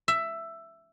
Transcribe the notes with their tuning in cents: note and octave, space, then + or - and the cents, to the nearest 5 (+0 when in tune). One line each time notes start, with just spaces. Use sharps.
E5 +10